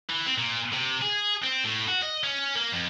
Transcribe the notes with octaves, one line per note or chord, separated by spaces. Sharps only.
E3
C4
A#2
C3
G#4
C4
A2
F#4
D#5
C#4
A#3
F2